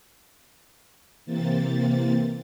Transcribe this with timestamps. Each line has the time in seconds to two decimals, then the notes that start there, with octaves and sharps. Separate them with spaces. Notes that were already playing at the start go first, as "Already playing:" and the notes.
1.25 C3 E3 A#3 C4 A6